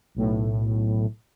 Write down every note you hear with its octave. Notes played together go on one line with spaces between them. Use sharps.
B1 A2